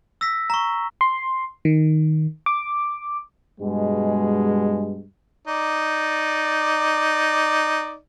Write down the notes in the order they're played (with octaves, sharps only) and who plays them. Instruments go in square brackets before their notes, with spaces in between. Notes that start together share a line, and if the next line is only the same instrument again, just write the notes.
[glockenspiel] E6 A#6 B6
A#5 C#6
[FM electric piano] C6
D#3
D6
[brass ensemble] G2 B2 G#3
[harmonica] D#4 D5